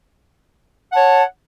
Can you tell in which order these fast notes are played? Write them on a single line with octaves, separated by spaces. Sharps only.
F#5 A5 C#5